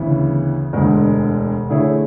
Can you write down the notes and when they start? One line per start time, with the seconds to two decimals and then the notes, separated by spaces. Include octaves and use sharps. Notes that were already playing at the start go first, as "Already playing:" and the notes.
Already playing: D2 C#3 E3 B3 E4
0.73 E1 D2 D3 G#3
1.69 D3 A3 E4 G#4 C#5